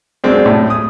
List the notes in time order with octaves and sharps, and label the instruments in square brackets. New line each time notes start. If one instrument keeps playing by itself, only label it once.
[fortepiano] F#2 G#3 C4 D4
A2
D#6